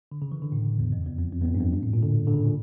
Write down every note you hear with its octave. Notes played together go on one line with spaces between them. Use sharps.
D3
C#3
E3
D3
A2
E2
F2
E2
F2
F2
E2
F2
G2
F2
G2
A2
A#2
D3
D3
C#3
A#2